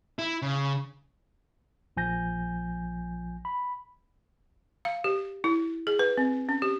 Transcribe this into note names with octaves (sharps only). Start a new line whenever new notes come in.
E4
C#3
A#1 F3 G#5 G6 A#6
B5
F5
G4
E4
G#4
B4
C4
C#4
G4